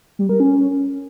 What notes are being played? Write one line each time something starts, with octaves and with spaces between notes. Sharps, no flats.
G3
A#4
C#4